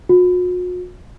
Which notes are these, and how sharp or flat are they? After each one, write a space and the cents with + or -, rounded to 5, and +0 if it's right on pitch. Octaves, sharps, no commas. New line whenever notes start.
F#4 -45